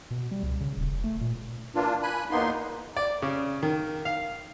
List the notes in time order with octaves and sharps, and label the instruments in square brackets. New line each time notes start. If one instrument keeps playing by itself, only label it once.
[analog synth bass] B2
G3
C#2
C#3
D#1
F1
A3
A#2
[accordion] E3 A#3 D4 F4
G#5 B5 F#6
E2 A#2 A#3 B3 D#4 C6
[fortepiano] D5
C#3
D#3
F5